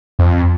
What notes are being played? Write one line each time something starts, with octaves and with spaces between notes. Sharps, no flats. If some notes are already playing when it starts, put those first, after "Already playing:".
F2